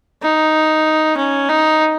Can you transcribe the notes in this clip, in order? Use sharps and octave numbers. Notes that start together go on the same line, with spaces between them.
D#4
C#4
D#4